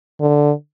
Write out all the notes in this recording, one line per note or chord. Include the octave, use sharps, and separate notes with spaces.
D3